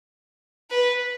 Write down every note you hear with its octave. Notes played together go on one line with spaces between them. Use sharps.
B4